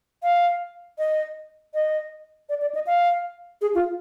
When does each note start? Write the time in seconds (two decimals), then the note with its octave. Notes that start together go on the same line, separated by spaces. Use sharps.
0.23 F5
0.98 D#5
1.74 D#5
2.49 D5
2.61 D5
2.75 D#5
2.86 F5
3.62 G#4
3.75 F4